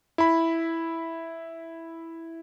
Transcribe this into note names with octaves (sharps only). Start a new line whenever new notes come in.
E4 B5